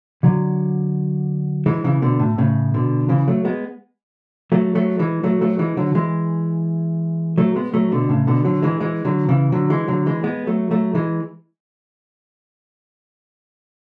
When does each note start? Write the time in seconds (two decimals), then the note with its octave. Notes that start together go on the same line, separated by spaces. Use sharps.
0.23 D3 F#3
1.66 E3 G#3
1.84 C#3 E3
2.02 B2 D3
2.19 A2
2.38 A2 C#3
2.74 B2 D3
3.09 C#3 E3
3.28 F#3 A3
3.45 G#3 B3
4.52 F#3 A3
4.75 F#3 A3
4.99 E3 G#3
5.24 F#3 A3
5.41 F#3 A3
5.59 E3 G#3
5.77 D3 F#3
5.95 E3 G#3
7.38 F#3 A3
7.55 G#3 B3
7.74 F#3 A3
7.91 B2 D3
8.09 A2 C#3
8.27 B2 D3
8.45 D3 F#3
8.62 E3 G#3
8.80 E3 G#3
9.05 D3 F#3
9.29 C#3 E3
9.52 D3 F#3
9.70 E3 G#3
9.88 D3 F#3
10.06 E3 G#3
10.24 G#3 B3
10.47 F#3 A3
10.71 F#3 A3
10.95 E3 G#3